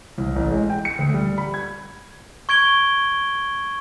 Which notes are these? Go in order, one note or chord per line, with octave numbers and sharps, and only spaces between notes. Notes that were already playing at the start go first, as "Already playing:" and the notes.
C2
A1
G#3
G5
C#7
D2
G3
B5
G#6
C#6 G#6 D7 G7